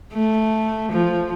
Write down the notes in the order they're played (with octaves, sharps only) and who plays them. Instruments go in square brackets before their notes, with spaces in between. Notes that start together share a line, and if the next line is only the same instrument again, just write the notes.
[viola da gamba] A3
F3